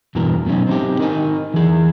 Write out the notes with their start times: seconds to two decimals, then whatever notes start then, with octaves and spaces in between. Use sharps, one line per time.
0.15 E2 G2 B2 E3 A#4
0.46 B2 F#3 C#4 D#4
0.67 C4 D#4 G4
0.99 D#4 A#4 C5 D#5 G#5
1.54 E3 G#4